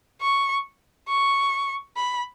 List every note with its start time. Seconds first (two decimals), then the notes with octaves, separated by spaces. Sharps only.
0.22 C#6
1.09 C#6
1.97 B5